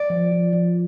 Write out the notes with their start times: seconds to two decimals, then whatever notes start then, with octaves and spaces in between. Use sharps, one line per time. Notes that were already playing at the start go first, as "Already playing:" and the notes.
Already playing: D5
0.10 F3
0.32 F3
0.53 F3